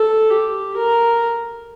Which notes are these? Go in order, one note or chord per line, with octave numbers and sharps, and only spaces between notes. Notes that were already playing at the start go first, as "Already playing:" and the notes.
Already playing: A4
G4
A#4